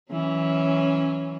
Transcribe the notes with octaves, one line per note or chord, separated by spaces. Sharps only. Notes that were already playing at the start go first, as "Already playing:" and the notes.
E3 F#3 C#4